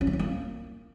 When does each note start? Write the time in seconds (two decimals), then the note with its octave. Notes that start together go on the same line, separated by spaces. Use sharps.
0.01 C#4
0.07 A3
0.13 E4
0.19 A#3